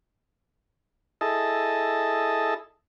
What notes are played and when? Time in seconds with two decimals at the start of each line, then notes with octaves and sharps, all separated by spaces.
1.21 E4 G#4 A4 D#5 A5